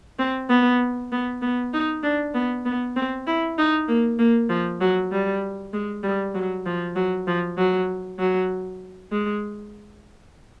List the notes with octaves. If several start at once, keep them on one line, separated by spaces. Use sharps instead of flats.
C4
B3
B3
B3
D#4
D4
B3
B3
C4
E4
D#4
A#3
A#3
F3
F#3
G3
G#3
G3
F#3
F3
F#3
F3
F#3
F#3
G#3